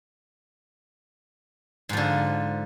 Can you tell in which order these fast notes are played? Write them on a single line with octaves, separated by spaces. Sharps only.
G#2 F3 D3